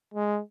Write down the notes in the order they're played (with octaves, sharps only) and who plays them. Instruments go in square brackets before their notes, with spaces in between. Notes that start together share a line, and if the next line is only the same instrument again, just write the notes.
[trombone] G#3